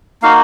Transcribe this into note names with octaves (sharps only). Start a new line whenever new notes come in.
A#3 D#4 F#4 F5